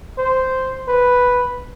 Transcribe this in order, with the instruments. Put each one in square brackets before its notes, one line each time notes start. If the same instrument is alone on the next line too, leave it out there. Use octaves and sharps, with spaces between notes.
[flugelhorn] C5
B4